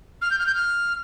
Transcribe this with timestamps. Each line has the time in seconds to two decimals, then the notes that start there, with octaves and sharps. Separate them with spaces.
0.21 F6
0.30 G6
0.38 F6
0.46 G6
0.54 F6